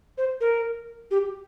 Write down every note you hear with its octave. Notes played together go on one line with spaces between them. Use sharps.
C5
A#4
G4